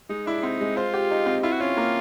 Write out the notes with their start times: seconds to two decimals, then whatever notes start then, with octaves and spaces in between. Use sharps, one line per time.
0.09 G#3 D#4
0.27 D4 E4
0.43 C4 D#4
0.61 G#3
0.77 F4 C5
0.94 G4
1.10 D#4
1.26 C4
1.43 E4 F4
1.52 F#4
1.60 C#4 F4
1.77 A#3